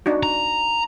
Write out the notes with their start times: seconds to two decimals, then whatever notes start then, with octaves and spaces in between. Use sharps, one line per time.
0.06 D4 D#4 F#4
0.23 A#5